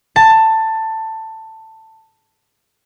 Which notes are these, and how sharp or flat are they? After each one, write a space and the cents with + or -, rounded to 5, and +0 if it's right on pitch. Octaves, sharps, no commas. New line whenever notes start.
A5 +15